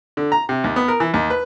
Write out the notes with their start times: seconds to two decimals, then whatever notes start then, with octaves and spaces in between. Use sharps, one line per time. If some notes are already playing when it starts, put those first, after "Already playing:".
0.17 D3
0.32 A#5
0.49 C3
0.64 D#2
0.76 B3
0.88 A#4
1.00 E3
1.14 D#2
1.30 B4